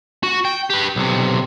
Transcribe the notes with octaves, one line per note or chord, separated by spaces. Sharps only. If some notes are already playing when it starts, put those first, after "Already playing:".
F#4
G5
G4 B4
B1 C3